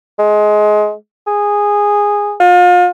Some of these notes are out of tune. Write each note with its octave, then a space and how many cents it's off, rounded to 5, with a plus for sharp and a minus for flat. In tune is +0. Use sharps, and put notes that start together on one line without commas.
G#3 +20
G#4 -10
F4 +35